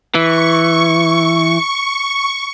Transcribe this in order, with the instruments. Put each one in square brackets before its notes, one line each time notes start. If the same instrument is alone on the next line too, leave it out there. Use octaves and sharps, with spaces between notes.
[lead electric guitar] E3 [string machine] C#6